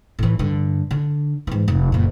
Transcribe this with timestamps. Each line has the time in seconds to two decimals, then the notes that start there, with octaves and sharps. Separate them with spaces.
0.19 A2 E3
0.39 G2 D3
0.91 D3
1.47 G#2 E3
1.68 F1
1.92 F#1 A#2